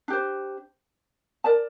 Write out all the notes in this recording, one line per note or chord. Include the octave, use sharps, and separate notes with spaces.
D4 G4 C5
A#4 D5 A5